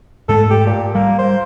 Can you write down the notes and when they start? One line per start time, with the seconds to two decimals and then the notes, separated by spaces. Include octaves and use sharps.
0.29 G#2 G#3 A3 A4
0.51 G4
0.66 A#2
0.95 G3 A#3
1.19 C5